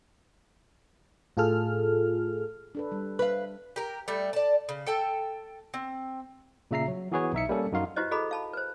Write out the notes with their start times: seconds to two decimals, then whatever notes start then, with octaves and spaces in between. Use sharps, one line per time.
1.37 A2 F4 G#4 A4 F6
2.75 D4 A4 B4
2.92 G3
3.19 B4 F5
3.76 G4 A#4
4.08 G3 A3
4.33 D5 A5
4.69 C#3
4.86 A4 G5 A5
5.74 C4
6.71 A#2 C#3 E5 A#5 C7
6.88 F#3
7.12 E3 B3 F#4 G#4 B4 C#5
7.33 B1 D#4 E5 C#7
7.49 G3 A#3 C#4 A4
7.72 F#2 D#4 F#4 F5 C6
7.96 E4 F#4 G4 B4 C5 D#5
8.11 F#4 G#4 A4 D#5 A#5 B5
8.31 F5 A5 B5
8.53 B4 C5